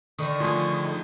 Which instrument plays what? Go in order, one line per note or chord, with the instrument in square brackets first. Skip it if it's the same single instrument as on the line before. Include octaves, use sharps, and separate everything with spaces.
[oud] D3 D#3 [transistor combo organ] C#6 D#6
[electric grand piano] A2 F3 [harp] F4 G#4
[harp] D#4